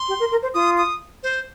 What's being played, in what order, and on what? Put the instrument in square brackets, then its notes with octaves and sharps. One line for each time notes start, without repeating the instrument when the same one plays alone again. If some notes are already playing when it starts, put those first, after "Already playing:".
Already playing: [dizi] C6
[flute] G4
A#4
A#4
C5
[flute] F4 [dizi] D#6
[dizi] D#6
C5